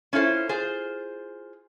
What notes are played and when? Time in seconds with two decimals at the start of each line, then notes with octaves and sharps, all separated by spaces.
0.13 C#4 E4 F4 A4 C5
0.49 F4 G#4 C5